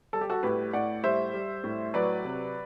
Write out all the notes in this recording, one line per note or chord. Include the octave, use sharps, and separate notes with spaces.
G3 A4
G4
F#4 A4
A2 G4 B4
A2 D5 F#5
G3 C5 E5
G3
A2
F#3 B4 D5
C3